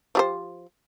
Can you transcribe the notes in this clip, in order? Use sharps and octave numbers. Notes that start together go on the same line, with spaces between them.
F3 G4 C5